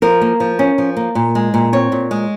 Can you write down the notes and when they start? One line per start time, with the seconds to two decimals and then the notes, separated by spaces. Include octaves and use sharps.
0.02 F3 A#4
0.21 A#3
0.40 F3
0.59 C#4
0.78 F3
0.97 A#3
1.15 A#2
1.35 G#3
1.54 A#2
1.73 C4 C#5
1.92 A#2
2.11 G#3